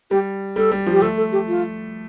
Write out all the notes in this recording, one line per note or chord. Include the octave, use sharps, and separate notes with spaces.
G3 G4
G3 A4
G3
F3
G4
A3 A4
A4
G4
F4